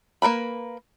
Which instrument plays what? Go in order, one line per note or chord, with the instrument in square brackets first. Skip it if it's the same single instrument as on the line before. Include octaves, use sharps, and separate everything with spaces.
[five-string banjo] A#3 A#4 B4 B5